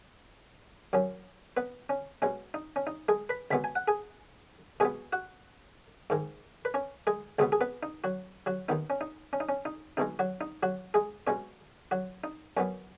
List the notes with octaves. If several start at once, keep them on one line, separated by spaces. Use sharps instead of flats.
F#2 F#3 C#4
B3 B4
C#4
B2 G#3 C#4
D#4
C#4
D#4
G#3 G#4
B4 B5
C#2 B2 G#3 B3 B5
G#5
F#5
G#4 G#5
B2 G#3 B3 G#4 G#5
F#4 F#5
G#2 D#3 G#3
B4
C#4 C#5
G#3 G#4
C#2 B2 G#3 B3 G#4
G#4
B3 B4
D#4
F#3 F#4
F#3 F#4
D#2 D#3 B3 D#4
C#4
D#4
C#4
D#4
C#4
D#4
B1 B2 G#3 D#4
F#3 F#4
D#4
F#3 F#4
G#3 G#4
B2 G#3 C#4 C#5
F#3 F#4
D#4
F#2 F#3 B3 C#4